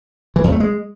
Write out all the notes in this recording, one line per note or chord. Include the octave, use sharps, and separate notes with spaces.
E3
E2
A3
G#3